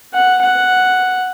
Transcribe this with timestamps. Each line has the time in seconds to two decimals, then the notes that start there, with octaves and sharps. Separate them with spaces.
0.13 F#5
0.41 F#5